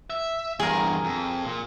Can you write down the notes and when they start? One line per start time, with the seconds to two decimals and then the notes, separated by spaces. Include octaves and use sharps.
0.10 E5
0.59 E2 G2 G#4 A#4
1.04 F2
1.44 A#2